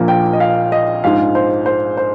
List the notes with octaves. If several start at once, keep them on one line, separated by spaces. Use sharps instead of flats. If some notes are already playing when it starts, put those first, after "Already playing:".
Already playing: A#1 A#2 F3 A#3
G5
D#5
F5
D#5
A#1 G#2 F3 F5
C5
C5
C5